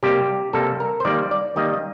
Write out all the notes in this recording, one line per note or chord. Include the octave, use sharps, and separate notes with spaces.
C3 G3 A#3 G4
C3 G3 A#3 A4
A#4
C5
D#3 G3 A#3 D5
D5
D#3 G3 A#3 D#5